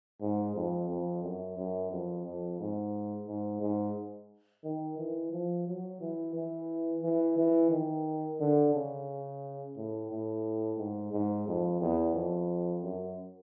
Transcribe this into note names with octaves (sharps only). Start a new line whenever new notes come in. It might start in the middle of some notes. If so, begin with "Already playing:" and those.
G#2
F2
F2
F#2
F#2
F2
F2
G#2
G#2
G#2
D#3
E3
F3
F#3
E3
E3
E3
E3
D#3
D3
C#3
A2
A2
G#2
G#2
F2
E2
F2
F#2